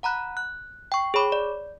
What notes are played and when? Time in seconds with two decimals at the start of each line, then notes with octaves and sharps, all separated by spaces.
0.03 F#5 A#5 B5 F#6
0.37 F#6
0.92 G5 C#6
1.14 G#4 C#5 B5 D6
1.32 D5